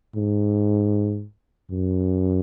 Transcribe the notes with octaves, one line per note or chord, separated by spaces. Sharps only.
G#2
F#2